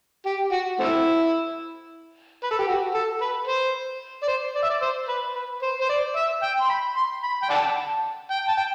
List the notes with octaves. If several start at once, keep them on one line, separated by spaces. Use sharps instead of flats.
G4
F#4
A3 C4 E4
B4
A4
G4
F#4
A4
B4
C5
D5
C5
D5
E5
D5
C5
B4
B4
C5
C5
D5
E5
G5
C6
B5
C6
B5
G5
D5 F#5 A5
G5
A5
G5